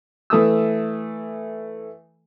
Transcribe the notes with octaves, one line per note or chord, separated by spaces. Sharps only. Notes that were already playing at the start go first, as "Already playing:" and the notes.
E3 A3 D#6 E6